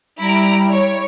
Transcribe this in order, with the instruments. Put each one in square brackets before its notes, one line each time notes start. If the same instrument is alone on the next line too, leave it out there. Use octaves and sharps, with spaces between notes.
[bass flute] G3 [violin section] E4 A#5 D7
[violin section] C#5